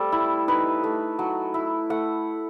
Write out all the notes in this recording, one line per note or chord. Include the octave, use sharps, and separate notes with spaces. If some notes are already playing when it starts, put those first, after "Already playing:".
Already playing: G3 A3 C4 A4
E4
D#4 B4
A3
F#3
E4
A3 F#5